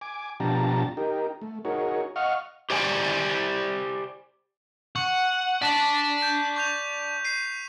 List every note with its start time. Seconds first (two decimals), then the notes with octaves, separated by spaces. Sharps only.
0.01 G#5 D6
0.40 B2 F3 D4 G4 A5 A#5
0.97 D#4 G4 A#4
1.41 A3
1.65 D#4 F#4 G#4 A#4 C#5
2.16 D#5 F5 F#5 C#6 F6
2.70 G4 C5 D5 G5 G#5
4.96 F#5 C#6
5.62 D5 A5 B6
6.22 G6
6.56 C#6 G6 F7
7.25 C7 D#7